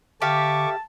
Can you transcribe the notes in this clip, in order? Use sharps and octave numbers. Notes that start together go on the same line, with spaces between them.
D3 G4 E5 F5 A5 C#6 D6